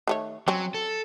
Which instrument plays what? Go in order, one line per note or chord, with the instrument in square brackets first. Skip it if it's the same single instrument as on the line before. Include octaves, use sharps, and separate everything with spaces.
[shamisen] D#3 A3 C#5
[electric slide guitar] F#3 [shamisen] C4 C#4
[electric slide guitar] A4